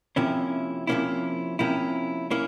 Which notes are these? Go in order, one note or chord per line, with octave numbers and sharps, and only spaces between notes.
C3 F3 A#3 C#4 E4
C3 F3 A#3 C#4 E4
C3 F3 A#3 C#4 E4
A#3 C#4 E4